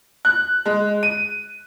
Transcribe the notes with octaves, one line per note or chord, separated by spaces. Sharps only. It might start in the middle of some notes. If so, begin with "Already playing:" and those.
F#6
G#3
D#7